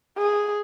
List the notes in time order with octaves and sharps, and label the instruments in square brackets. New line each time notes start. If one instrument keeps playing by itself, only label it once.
[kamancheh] G#4